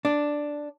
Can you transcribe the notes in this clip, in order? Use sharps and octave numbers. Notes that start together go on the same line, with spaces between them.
D4